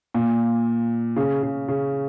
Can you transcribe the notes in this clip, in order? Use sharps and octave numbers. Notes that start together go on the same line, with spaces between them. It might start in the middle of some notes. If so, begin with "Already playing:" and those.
A#2
C#3
C#3
C#3